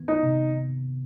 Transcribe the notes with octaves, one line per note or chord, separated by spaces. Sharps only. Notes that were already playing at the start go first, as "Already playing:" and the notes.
Already playing: D#3 B3
D#4
C3